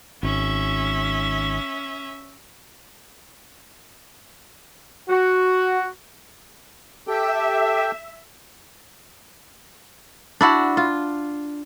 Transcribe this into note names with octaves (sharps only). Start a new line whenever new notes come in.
G#1 C#4 E5
F#4
G4 A4 E5 G5
D4 E4 F#4
F4